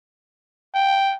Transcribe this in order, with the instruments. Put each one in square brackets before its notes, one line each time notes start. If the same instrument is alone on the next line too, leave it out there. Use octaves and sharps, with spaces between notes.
[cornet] G5